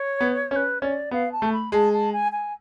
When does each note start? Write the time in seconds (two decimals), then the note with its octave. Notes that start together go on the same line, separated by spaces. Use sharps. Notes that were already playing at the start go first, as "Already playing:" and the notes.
Already playing: C#5
0.21 B3
0.51 C#4 C#5
0.56 B4
0.81 C#4 D5
1.11 B3 F5
1.32 A5
1.42 A3
1.52 B5
1.72 G#3 A5
1.93 A5
2.12 G#5
2.32 G#5